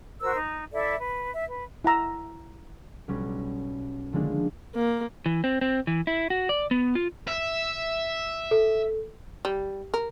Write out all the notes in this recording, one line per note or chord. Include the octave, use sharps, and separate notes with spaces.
F#4 A#4 C5 E6
D#4
E4 A4 D5 E5
B4
E5
B4
E4 F#5 A#5 E6
B1 G3 C#4 B4
D3 D#3 F3 G#3 A#3 D4
A#3
E3
C4
C4
E3
E4
F#4
D5
B3
F4
E5
A4
G3
A#4